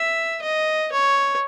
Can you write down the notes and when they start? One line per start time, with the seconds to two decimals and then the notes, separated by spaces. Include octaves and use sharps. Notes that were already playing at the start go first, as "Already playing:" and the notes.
Already playing: E5
0.42 D#5
0.92 C#5